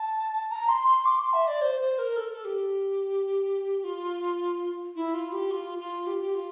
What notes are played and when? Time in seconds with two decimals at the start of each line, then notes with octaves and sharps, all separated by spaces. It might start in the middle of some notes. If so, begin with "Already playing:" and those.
Already playing: A5
0.50 A#5
0.69 C6
0.88 C6
1.06 D6
1.19 C6
1.33 E5
1.48 D5
1.62 C5
1.80 C5
1.99 A#4
2.16 A4
2.25 A#4
2.33 A4
2.45 G4
3.84 F4
4.95 E4
5.14 F4
5.32 G4
5.51 F4
5.79 F4
6.07 G4
6.21 G4
6.35 F4